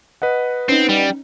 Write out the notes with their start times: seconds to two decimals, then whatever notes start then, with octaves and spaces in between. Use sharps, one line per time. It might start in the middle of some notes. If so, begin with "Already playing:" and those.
0.22 B4 D#5 F#5
0.69 C4 C#4 D#4
0.89 G3